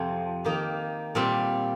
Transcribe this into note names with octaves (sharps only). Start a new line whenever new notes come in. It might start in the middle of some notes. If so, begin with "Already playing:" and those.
Already playing: F2 C3 F3 C4
D#3 A#3 D#4 G4
A#2 G3 C4